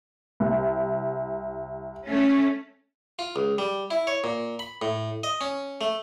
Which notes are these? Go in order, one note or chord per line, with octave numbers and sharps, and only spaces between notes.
C2
A3 C#4
F4
C#2
G3
E4
C#5
A#2
B5
A2
D#5
C#4
A3